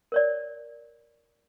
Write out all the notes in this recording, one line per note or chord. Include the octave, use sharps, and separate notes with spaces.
A#4 C#5 D5